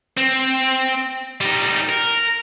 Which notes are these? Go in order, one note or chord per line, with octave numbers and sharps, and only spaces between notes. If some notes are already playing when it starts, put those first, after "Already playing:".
C4
G3 D#4
A#4